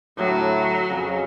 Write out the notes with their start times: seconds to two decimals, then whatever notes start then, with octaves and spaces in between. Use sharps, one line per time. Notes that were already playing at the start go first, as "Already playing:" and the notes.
0.17 D2 A2 F#3
0.88 F2 C#3